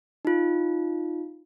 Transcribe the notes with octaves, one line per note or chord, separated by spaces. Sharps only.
D#4 F4